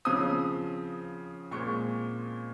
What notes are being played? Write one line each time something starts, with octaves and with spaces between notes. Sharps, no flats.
C#3 F3 C4 D#6
A#2 G#3 C4 C#6